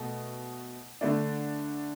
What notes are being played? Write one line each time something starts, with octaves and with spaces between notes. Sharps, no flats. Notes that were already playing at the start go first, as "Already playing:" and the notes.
Already playing: B2 A3
D3 A3 D4